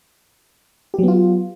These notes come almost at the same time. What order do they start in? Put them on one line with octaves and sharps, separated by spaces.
G4 F#3 B3 F4